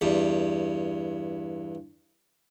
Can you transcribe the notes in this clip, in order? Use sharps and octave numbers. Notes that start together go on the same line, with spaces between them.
E2 G2